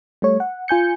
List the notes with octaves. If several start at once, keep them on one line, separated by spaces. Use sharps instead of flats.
G3 A3 C#5
F#5
F4 G#5 G6 C#7